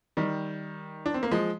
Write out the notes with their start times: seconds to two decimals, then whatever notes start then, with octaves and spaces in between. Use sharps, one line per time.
0.17 D#3 G3
1.06 D4
1.14 C4
1.23 A#3
1.31 F3 G#3